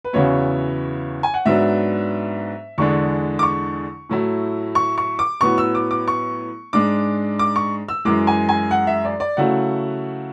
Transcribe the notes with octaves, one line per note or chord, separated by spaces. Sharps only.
B4
E2 C#3 F#3 B3 E4 C#5
G#5
F#5
G#2 F#3 B3 D4 E5
E2 D3 G#3 D4 C#6
D6
C#6
A2 F#3 A3 E4
C#6
C#6
D6
A2 F#3 B3 C#6
E6
D6
D6
C#6
G#2 G#3 D4 D6
D6
C#6
E6
F#2 E3 G#3 D6
G#5
G#5
F#5
E5
D5
D5
C#3 F#3 A3 E4 F#5